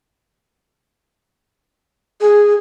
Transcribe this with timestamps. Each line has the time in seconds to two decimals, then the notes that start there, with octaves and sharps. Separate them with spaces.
2.21 G#4